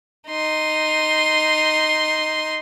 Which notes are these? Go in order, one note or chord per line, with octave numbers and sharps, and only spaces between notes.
D#4 C6